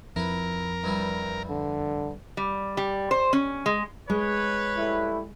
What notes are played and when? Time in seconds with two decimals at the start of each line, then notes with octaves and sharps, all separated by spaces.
0.16 F2 E4 A#4 B4
0.84 G2 E3 G3
1.49 D3
2.37 G3
2.77 G3
3.11 C5
3.33 C#4
3.66 G#3
4.10 G#3 B4 C#5
4.76 G3 A3 E4